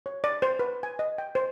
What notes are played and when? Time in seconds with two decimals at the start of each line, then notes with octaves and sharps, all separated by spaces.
0.06 C#5
0.24 D5
0.42 C5
0.59 B4
0.83 G#5
0.99 D#5
1.18 G5
1.35 C5